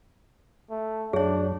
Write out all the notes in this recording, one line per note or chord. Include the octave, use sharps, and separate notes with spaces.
A3
F#2 F#3 D4 G#4 C#5